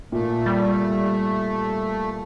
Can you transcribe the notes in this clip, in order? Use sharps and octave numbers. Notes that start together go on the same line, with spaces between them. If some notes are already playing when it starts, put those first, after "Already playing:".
A#2 A3
G3